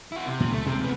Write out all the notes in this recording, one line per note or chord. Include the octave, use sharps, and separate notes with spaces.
E4 F#4
C3
A#2
C#2 A3
C2 C3 G#3 C4
D2 B3